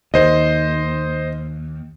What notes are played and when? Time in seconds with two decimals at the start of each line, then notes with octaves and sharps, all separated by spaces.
0.14 D#2 C5 D#5